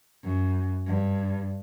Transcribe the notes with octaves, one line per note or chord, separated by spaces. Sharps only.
F#2
G2